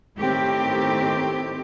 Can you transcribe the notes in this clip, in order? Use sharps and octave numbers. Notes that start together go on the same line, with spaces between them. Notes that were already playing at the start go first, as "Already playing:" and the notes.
A2 D#3 C4 G4